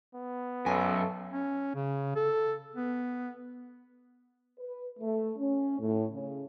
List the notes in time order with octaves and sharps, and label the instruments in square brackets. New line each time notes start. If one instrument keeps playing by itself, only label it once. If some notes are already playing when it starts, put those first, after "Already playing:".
[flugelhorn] B3
[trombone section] B1 A4 [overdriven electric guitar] F#2 [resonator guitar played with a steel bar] G#5
[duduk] C#4
C#3
A4
B3
[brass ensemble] B4
A3
C#4
A2
C#3